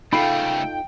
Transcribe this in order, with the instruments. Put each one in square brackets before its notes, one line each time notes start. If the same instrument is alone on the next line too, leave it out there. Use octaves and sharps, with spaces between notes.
[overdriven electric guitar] C#3 A3 [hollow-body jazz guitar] D#4 F4 A4 [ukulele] F5 B5 [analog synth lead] G5